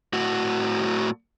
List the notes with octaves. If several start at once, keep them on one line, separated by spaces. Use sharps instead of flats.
A2 F#4